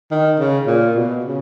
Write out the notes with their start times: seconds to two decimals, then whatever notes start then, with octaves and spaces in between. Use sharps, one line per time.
0.11 D#3
0.40 C#3
0.67 A#2
0.96 B2
1.24 C#3